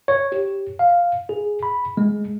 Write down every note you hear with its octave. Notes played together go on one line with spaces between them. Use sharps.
C#5
G4
F5
G#4
B5
G#3